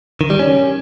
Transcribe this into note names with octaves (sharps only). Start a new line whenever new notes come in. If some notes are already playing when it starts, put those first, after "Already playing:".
D#3
G3
C#4